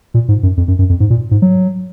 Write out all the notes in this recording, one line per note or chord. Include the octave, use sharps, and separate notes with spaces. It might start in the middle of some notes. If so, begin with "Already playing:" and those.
A#2
G#2
F#2
F2
F#2
F#2
F2
G#2
A#2
G#2
F#3